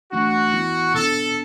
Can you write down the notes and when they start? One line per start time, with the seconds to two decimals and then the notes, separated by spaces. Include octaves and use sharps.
0.12 E3 A3 D4 F#4
0.53 E3 B3 E4
0.94 B2 B3 D4 A4